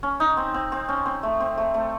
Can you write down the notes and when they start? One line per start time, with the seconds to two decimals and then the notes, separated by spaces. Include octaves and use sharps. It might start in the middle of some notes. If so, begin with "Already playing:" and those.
0.03 C#4
0.20 D#4
0.37 C4
0.54 C4
0.72 C4
0.89 C#4
1.06 C4
1.23 A3
1.40 C4
1.58 A3
1.74 A3